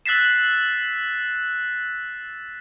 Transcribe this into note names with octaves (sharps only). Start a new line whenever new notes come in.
E6 F#6 A6 B6 C7 E7